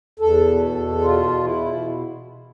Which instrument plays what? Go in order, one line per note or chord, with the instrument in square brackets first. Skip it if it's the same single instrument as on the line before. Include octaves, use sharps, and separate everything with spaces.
[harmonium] E2 A4
B2
E2
B2 F4
E2
E4
B2